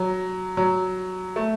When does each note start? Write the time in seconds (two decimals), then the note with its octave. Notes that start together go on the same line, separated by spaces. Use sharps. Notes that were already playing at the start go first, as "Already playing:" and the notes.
Already playing: F#3
0.57 F#3
1.36 A3